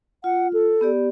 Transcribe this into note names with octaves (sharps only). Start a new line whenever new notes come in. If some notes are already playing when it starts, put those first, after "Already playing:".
F4 F#5
A4
B3 G4 D5